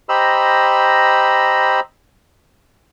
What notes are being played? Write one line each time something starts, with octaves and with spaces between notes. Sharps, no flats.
G4 C5 D#5 A#5 B5 E6